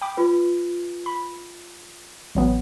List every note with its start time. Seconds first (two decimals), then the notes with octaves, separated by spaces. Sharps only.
0.02 G5 B5 D6
0.17 F4 B4
1.06 B5
2.35 A1 F#3 B3